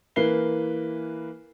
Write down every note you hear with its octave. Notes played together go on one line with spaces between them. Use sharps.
E3 A#3 B4 C7 G7